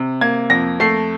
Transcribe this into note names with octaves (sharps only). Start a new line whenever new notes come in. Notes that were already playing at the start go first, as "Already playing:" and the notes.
Already playing: C3
A#3 G#6
F2 A#6
A3 C7